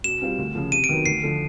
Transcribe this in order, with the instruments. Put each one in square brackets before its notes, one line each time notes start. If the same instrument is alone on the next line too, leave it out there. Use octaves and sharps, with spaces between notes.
[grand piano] B2 [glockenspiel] E7
[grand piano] G3 C4 F4
D2
C#3 F3
[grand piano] C3 [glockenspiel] D#7
[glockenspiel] D7
[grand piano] D#3 F#3 B3
[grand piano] D2 [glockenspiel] C7
[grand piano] D3 F3